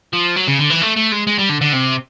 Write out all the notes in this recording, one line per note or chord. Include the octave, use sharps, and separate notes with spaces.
F3
F#3
C#3
D3
E3
A3
A3
G#3
G#3
G3
D3
D3
C3